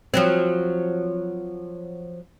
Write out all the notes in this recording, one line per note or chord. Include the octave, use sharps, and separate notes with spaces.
F3 F#3 C4